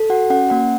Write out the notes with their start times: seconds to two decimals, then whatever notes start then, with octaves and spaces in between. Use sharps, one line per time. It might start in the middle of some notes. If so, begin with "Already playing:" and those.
Already playing: A4
0.10 F#4 F#5
0.30 C#4 F#5
0.50 A#3 F#5